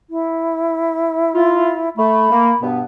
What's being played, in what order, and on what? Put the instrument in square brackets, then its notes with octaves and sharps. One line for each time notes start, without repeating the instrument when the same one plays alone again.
[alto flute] E4
[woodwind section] F4
[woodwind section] A3 [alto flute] B5
[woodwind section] A#3
G2 B2 B3